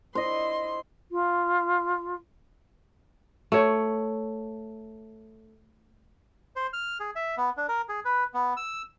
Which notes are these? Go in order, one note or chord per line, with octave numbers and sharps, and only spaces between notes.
E4 C5 D#5 C6
F4
A3 C#5
C5
F6
G#4
E5
B3
D4
A#4
G#4
B4
B3
E6